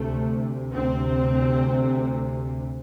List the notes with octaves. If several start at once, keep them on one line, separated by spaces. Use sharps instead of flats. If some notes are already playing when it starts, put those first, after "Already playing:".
Already playing: D2 C3 A3
D2 C3 C4